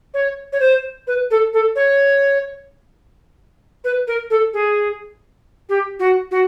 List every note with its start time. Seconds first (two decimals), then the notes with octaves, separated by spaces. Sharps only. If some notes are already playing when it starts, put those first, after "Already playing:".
0.14 C#5
0.52 C#5
0.60 C5
1.07 B4
1.30 A4
1.53 A4
1.75 C#5
3.84 B4
4.07 A#4
4.30 A4
4.53 G#4
5.69 G4
5.99 F#4
6.31 F#4